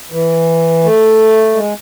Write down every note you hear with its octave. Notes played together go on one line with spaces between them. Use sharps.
E3
A3
G#3